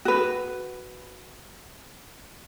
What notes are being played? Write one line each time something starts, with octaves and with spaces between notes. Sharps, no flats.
F#4 B4